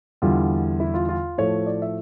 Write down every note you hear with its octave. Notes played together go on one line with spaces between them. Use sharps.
E2 D3 G3 F4
E4
F4
F4
A2 F3 A3 C#5
D5
E5